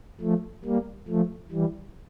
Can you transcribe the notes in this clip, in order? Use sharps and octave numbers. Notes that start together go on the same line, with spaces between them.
F3 A3
G3 A#3
F3 A3
E3 G3